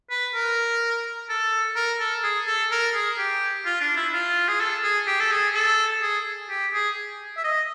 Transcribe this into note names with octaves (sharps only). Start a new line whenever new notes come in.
B4
A#4
A4
A#4
A4
G#4
A4
A#4
G#4
G4
F4
D4
E4
F4
G#4
A4
G#4
G4
A4
G#4
A4
G#4
G4
G#4
E5
D#5